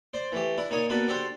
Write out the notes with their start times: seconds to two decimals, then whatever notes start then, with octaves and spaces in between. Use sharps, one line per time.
0.14 C5 D5
0.32 E3 A3 G4
0.57 D4 E4
0.70 A#2 D#4 C#5 G#5 D#6
0.89 A#3 B3 D4 F#4 A4 B4
1.08 D4 F#4 G4 A4 C5